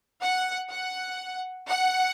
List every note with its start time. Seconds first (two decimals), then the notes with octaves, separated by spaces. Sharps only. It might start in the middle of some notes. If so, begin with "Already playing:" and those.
0.21 F#5
0.70 F#5
1.67 F#5